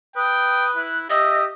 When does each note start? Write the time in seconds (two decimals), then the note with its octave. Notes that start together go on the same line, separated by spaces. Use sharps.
0.16 B4 G5 D#6
0.76 E4 F#6
1.10 G4 D#5 E5 D#6